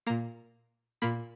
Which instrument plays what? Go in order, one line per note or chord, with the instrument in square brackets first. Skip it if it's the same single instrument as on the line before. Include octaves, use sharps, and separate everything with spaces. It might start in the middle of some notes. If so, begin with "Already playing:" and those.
[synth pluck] A#2 A#3 A#5
A#2 A#3 B5